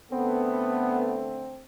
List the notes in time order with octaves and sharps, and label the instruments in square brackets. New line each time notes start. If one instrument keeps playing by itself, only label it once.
[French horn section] D3 A3 A4 [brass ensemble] B3 [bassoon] C4